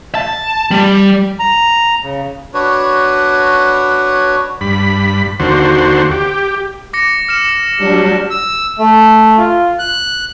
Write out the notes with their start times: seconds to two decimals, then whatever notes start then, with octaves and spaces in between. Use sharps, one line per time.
0.15 A5
0.71 G3
1.39 A#5
2.03 C#3
2.54 D4 F#4 B4 C#5
4.61 G2 B5
5.40 D#2 D3 F#4 C5
6.11 G4
6.93 D6 A#6 C#7
7.29 F6 C#7 E7
7.82 F#3 G3 D4
8.30 E6
8.79 A3
9.38 F4
9.79 F#6